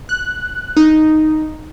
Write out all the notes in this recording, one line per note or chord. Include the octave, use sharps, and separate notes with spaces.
F#6
D#4